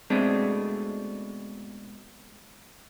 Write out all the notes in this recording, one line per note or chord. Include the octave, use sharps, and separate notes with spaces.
B2 G#3 A3 C4 D4